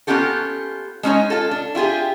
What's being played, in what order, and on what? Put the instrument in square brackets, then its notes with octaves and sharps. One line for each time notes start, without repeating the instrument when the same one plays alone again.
[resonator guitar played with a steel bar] A#3 B3 C#4 F4 G4 A4
G#3 C#4 D#4 C#5
F4 A4
D4
E4 F4 G4 G#4